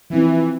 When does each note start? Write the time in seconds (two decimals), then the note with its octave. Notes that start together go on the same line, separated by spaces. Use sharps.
0.10 E3 F3 C4 E4